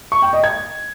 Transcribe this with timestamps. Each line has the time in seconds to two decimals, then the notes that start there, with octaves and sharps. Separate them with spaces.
0.12 C#6
0.22 G5
0.33 D#5
0.44 G#6